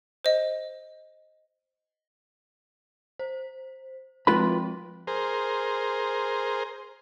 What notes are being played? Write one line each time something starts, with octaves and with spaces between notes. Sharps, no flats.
C5 D#5
C5
F3 G#3 C4 F4 B4 B5
G#4 A#4 C5